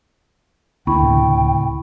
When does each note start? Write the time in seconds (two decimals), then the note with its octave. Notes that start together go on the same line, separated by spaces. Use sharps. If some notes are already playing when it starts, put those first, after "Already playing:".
0.87 D2 A#3 E4 G5 B5 C#6
1.02 C#2 A2 C3